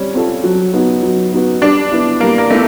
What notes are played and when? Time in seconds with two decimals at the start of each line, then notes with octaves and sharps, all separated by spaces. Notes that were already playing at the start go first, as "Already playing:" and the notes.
Already playing: G3 C4 C#4
0.14 C4 F4 A4
0.44 F#3
0.73 B3 D#4 F#4 B4
1.03 F#3
1.32 B3 D#4 F#4 B4
1.62 G3 D4
1.92 B3 E4
2.20 G3 A#3
2.38 A#3
2.50 A3 B3 E4